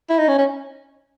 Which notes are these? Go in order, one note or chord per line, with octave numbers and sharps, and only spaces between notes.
E4
D#4
C#4
C#4